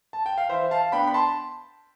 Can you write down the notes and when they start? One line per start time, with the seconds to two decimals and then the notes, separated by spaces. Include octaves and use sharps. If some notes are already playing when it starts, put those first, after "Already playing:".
0.13 A5
0.26 G5
0.38 F5
0.49 E3 C5 E5
0.71 F5 A5
0.92 B3 D4 G5 B5
1.07 B5
1.14 A5 C6